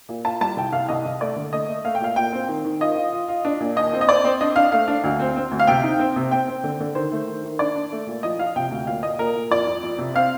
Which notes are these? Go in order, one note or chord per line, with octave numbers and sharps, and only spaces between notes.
A#2
F4 A5
G3 A5
C2 G5
C2 F5
C2 D#5
C2
A3 D5
D3
A3 D#5
A3
A3 F5
G5
A#2 F5
A#2 G5
C4
D#3
D#3
F4 D#5
F4
F4
F4
D4
A#2
D#2 D#5
C4
D#5
C4 D5
C4
D4 D#5
D4 F5
A3 F5
D4
D2
C4
C4
D2
F5
C3 G5
D#4
C4
C3
C4 G5
C4
D3
D3
D#3 C5
A3
D#3
D#3
D4 D5
D4
A3
A#2
F3 D#5
F3 F5
C3 G5
D2
A#2 F5
A#2 D#5
A#2 A#4
A#2
F2 D5
F2
F2
C3
C4 F5